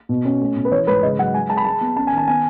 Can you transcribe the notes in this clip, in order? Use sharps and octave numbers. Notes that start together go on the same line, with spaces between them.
B2
C#4
A3
B2
B4
E3 C#5
G#2 B4
C#3 D#5
F#3 F#5
G#3 G#5
G#3 A5
B5
G#3 A5
B3
C#4 A5
G#5
D#3 A5
B3 G#5